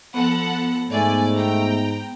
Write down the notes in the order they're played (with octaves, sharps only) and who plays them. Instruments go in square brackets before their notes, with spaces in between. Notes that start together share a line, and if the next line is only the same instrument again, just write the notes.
[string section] F3 A4 F#5 [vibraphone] B3
[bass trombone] G#2 [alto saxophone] A3 [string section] D5 G#5
[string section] G5 A#5